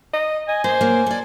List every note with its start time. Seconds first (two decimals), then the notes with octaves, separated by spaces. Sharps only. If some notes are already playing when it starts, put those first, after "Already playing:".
0.13 D#5
0.48 D#5 G#5
0.64 A#3 C5
0.81 F#3 A#3
1.06 A4 D5